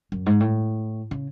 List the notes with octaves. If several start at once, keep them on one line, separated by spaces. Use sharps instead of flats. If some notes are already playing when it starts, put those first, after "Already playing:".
F#2
G#2
A2
C#3